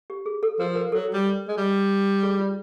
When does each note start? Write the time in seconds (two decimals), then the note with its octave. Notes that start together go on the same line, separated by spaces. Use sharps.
0.10 G4
0.26 G#4
0.43 A4
0.59 F3 A#4
0.76 A#4
0.92 F#3 A4
1.14 G3
1.48 G#3
1.57 G3
2.23 G#4
2.39 F4